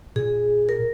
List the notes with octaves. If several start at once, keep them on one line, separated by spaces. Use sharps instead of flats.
A#2 G#4
A#4